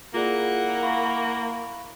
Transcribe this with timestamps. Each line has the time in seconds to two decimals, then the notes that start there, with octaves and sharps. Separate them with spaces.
0.14 A#3 E4 F4 G#4 D5 F#5
0.83 F5 B5 C#6